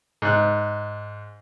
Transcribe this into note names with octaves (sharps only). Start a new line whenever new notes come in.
G#2 F#6